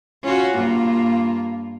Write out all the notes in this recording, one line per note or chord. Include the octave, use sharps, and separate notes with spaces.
C#4 F4 F#4
G2 A#3 F4